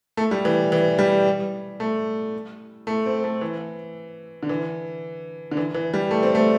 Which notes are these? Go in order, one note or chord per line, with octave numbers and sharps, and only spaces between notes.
A3
G3
E3
E3
G3
A3
A3
C4
A3
E3
D3
E3
D3
E3
E3
G3
A3
C4
A3